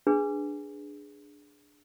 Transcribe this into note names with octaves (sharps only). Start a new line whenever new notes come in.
D4 G#4 B4